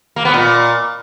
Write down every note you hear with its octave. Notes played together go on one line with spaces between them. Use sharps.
A#3
B3
A#2